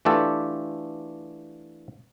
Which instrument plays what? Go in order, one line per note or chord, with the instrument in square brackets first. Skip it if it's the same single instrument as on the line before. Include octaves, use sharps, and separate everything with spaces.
[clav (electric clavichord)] E3 A3 D4 F4 G4 A4